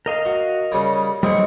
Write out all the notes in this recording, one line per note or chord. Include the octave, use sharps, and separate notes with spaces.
A#4 D#5 F5
F#4
C#3 G3 C#4
B1 G3 G#3 C4 C#5